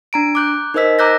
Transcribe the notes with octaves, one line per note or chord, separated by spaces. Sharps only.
D4 A#5 D7
D6 F#6 G6
D#4 A#4 C5 D#5 E6 B6
A#5 D6 E6 F#6 G6 A#6